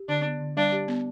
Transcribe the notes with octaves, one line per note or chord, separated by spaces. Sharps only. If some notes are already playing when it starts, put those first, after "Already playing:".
Already playing: G4
D3 D4
B3
D3
G3 D4
G4
B3